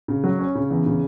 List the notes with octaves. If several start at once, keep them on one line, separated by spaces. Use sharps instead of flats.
C#3
F#3
C#4
C#3
E2
C#3